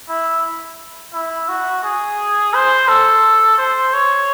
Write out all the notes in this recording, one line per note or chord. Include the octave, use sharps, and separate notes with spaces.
E4
E4
F#4
G#4
C5
A4
C5
C#5